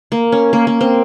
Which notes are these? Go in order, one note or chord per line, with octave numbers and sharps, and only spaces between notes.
A#3
C#4
A#3
A#3
C4